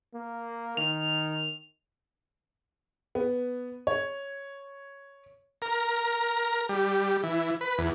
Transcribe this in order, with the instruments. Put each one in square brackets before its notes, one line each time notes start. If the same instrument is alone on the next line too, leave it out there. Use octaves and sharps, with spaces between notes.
[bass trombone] A#3
[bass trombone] D#3 [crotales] F7
[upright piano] B3
C#5
[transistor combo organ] A#4
G3
E3
B4
E2